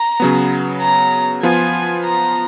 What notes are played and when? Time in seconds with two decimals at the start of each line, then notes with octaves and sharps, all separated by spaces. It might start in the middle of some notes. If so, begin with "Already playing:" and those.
Already playing: A#5
0.20 C#3 F#3 B3
0.81 A#5
1.43 F3 B3 F4 G#5
2.05 A#5